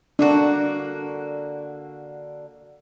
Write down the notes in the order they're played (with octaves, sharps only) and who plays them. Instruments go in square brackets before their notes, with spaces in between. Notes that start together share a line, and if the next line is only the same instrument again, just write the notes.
[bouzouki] D3 A#3 F#4 [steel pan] D4